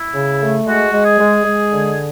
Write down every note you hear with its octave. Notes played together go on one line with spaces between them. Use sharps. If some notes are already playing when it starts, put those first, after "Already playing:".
Already playing: E4
C#3
A3
G#3 F#4
G#3
G#4
G#3
G#3
D3